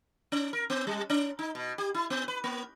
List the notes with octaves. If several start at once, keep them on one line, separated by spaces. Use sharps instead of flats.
C#4
A#4
B3
G3
C#4
D#4
B2
G4
E4
B3
B4
A#3